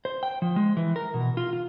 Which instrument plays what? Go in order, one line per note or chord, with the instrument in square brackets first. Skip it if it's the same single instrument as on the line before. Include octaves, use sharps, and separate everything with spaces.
[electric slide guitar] C5
G5
F3
G#3
E3
A#4
B2
F4
F4